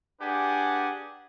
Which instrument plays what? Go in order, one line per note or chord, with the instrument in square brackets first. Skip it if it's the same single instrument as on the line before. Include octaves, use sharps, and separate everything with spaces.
[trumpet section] D4 G4 G#4 B4 F#5 G#5